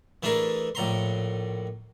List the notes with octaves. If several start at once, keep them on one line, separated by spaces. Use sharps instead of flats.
E3 A3 D4 G#4 A#4
A#1 A2 A#5 C6